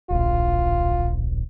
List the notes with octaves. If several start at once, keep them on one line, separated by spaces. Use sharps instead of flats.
D1 A#1 F4